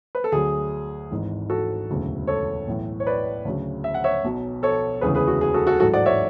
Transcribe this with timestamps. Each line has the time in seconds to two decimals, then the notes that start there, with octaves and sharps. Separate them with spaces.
0.15 B4
0.24 A4
0.32 D2 D3 F#3 G#4
1.11 G#1 G#2 E3
1.50 F#4 A4
1.90 E1 D2 C#3 F#3
2.27 A4 C#5
2.67 B1 A2 E3
3.00 C#5
3.07 B4 D5
3.45 D2 C#3 F#3
3.84 E5
3.94 F#5
4.04 C#5 E5
4.24 B1 B2 F#3
4.63 A4 C#5
5.01 E1 D2 C#3 E3 G#4 B4
5.15 G#4 B4
5.27 F#4
5.41 G#4
5.54 F#4 A4
5.67 F#4 A4
5.80 A1 G#2 F#3 F#4 A4
5.94 D5 F#5
6.06 C#5 E5